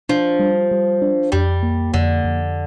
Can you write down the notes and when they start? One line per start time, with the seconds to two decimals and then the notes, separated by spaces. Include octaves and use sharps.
0.09 F3 D4
0.40 G3
0.71 G3
1.02 D4
1.32 F2 G3
1.63 A#3
1.94 F2 D3
2.25 F2